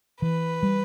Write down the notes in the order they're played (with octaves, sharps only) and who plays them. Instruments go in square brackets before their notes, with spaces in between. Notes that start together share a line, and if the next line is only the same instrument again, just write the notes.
[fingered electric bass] E3 [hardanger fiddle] B4
[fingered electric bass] G3